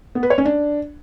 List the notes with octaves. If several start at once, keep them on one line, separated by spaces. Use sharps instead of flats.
B3
B4
C#5
C#4
D4